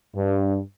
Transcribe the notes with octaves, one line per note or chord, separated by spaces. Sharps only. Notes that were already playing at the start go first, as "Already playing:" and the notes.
G2